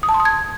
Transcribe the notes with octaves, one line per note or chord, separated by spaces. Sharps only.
D#6
A5
C6
D#6
G#6